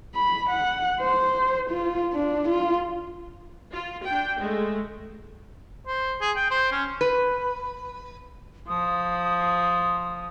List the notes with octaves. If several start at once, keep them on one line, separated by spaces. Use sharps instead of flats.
B5
F#5
C5
F4
D4
F4
F4
D4 G5
G#3 A3
C5
G#4
G5
C5
C#4
B4
F3 D#6